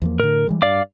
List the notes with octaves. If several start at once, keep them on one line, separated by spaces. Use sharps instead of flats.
E2 F3 A#3
A2 D3 A#4
E3 G3 G#3
G2 D5 F5 D6